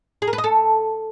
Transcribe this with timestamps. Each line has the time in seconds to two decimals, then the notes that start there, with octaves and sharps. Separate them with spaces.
0.22 G#4
0.27 A#4
0.33 B4
0.38 D#5
0.44 A4